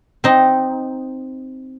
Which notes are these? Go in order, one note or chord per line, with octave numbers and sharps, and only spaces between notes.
C4 D#4